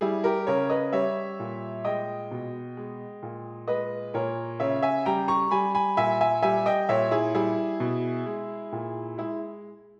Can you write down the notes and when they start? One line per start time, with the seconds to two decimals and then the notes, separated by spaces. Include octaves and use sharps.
0.01 G3 E4 G#4
0.24 G4 A#4
0.47 C#3 A#4 C#5
0.70 B4 D#5
0.93 G3 C#5 E5
1.40 A#2
1.85 G#3 D#5 G5
2.31 B2
2.77 G#3
3.23 A#2
3.68 G#3 B4 D#5
4.14 A#2 A#4 C#5
4.60 C#3 C#5 E5
4.82 E5 G#5
5.06 G3 G5 A#5
5.28 A#5 C#6
5.51 G3 G#5 B5
5.75 G#5 B5
5.97 A#2 E5 G#5
6.21 E5 G#5
6.43 G3 E5 G#5
6.66 D#5 G5
6.89 A#2 C#5 E5
7.11 E4 G#4
7.34 G3 E4 G#4
7.80 B2
8.26 G#3
8.72 A#2
9.18 G#3 E4